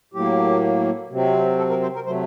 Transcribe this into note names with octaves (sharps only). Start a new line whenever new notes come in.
A2 F#3 A#3 G4
C3 F#3 C4
A4
A#4
C5
A#4
C3 F#3 A3 C5